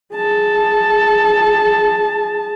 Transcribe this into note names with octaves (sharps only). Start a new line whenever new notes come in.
G#4 A5